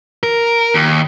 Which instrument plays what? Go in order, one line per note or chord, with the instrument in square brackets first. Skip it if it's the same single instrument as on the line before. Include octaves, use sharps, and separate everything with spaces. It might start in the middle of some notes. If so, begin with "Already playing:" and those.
[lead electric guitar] A#4
D#2